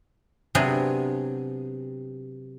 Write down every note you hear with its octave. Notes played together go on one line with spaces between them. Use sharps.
C3 F#3 B3 D4 G4 G#4